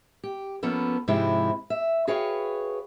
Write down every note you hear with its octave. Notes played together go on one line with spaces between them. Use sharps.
G4
F3 A#3 B3 C#4 A4
G#2 C3 F3 G#3 C4 E4
E5
F#4 G#4 B4 C#5 F5 G5